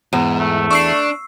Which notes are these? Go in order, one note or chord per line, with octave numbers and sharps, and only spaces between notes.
E2 G#2
A3
D4 C#6 E6 C7